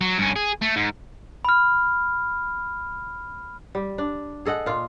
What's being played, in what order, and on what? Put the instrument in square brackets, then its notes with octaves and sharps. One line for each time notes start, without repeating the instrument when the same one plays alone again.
[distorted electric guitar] F#3
G2 C#4
G#4
A3
G#2
[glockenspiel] B5 F6
[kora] G3
D4
G#4 A4 D#5 F#5
A#2 F4